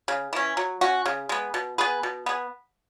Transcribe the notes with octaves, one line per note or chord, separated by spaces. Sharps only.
C#3
E3 C#4
F#3
C#4 F#4
C#3
G#3 B3
B2
B3 G#4 B4
B2
B3 G#4